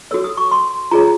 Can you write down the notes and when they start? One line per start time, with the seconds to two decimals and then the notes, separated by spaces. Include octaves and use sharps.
0.11 F#4 A4 C#5 E6
0.24 D#6
0.37 C#6
0.51 C6
0.91 F4 G#4 C#5 A#5